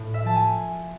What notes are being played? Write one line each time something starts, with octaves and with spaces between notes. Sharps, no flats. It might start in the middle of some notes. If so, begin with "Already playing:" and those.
Already playing: A2
E5
F3 A5
G#5